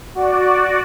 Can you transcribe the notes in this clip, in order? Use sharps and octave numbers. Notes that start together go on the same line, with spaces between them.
F#4 D5